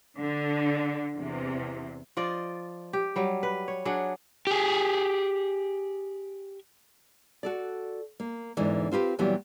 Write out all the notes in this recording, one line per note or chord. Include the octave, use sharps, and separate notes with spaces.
D3
E2 C3
F3 F4 D5 D#5
G4
F#3 G3
B4
C#5
F#3 D4 G#4 F#5
G4 G#4
F#4 A4 D5
A#3
E2 G#2 D3 E3
C4 F4 G4 B4
A#2 E3 F#3 G3 B3 G4